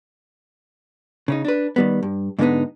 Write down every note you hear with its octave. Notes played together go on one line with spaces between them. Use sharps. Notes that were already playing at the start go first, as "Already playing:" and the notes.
C#3 C#4 D#4
D4 B4
D#3 G3 B3
G2
G#2 D3 G#3 A#3 B3 D#4